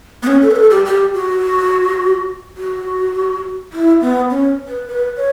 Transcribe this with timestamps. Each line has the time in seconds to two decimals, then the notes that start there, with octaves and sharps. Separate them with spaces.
0.23 B3
0.27 C#4
0.42 A4
0.51 B4
0.56 A4
0.71 G4
0.85 G4
1.14 F#4
2.58 F#4
3.73 E4
4.01 B3
4.30 C#4
4.68 B4
4.88 B4
5.17 C#5